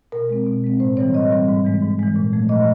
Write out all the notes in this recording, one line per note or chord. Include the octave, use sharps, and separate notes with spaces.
B2 A#4
G#3 C4
B2
G#3 C4
A2 C5
E3 G3 C4 C#5
A2 D#5
E3 G3 C4
G#2
E3 G#3
G#2
E3 G#3
A#2
F3 A3
A#2 D#5